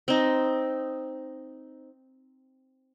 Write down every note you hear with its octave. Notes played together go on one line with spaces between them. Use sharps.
C4 D#4